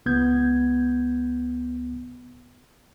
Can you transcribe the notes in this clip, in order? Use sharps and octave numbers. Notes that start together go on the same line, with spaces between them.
C#2 B3 G6 G#6